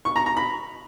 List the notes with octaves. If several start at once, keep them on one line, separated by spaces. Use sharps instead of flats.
C#6
A#5
A#5
B5